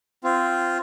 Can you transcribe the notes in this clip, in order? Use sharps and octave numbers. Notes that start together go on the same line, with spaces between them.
C4 F4